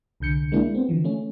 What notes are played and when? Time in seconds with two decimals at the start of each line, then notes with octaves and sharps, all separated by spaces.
0.20 C2 D3 G6 C#7
0.52 G#3 A#3 D4 E4
0.74 B3 C4
0.89 D3 E3 F3
1.04 A3 C#4